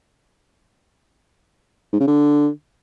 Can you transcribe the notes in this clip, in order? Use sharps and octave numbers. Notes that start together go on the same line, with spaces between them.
G#2
C#3
D3